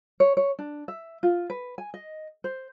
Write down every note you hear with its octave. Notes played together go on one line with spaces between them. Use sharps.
C#5
C#5
D4
E5
F4
B4
G#5
D#5
C5